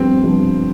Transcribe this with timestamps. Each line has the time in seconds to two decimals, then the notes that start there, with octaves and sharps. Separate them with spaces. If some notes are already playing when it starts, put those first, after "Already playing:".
Already playing: G2 F3 B3 C4
0.23 G2 F3 B3